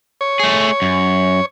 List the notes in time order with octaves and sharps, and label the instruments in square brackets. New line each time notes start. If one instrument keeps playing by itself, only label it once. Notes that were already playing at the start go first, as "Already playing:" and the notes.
[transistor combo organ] C#5
[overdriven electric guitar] A3 G#4
F#2